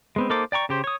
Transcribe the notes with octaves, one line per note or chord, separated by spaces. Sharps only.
G#3 B3 C4
A#3 D#4 A4 C5 D6
D5 G5 A#5 C#6
C#3 G4 C5
C#5 D#6